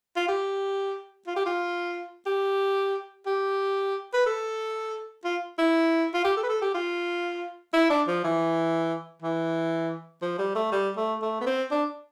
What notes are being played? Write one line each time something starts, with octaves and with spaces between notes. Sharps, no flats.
F4
G4
F4
G4
F4
G4
G4
B4
A4
F4
E4
F4
G4
A4
B4
A4
G4
F4
E4
D4
F3
E3
E3
F3
G3
A3
G3
A3
A3
B3
C4
D4